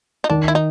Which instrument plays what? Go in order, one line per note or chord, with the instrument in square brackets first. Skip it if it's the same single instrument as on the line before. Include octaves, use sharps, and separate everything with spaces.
[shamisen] D#4
[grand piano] D#3 [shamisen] D4
[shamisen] E4
D#4